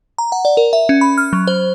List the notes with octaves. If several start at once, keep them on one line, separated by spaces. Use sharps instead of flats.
A#5
F#5
D5
A#4
E5
C#4
B5
F6
F#3
C5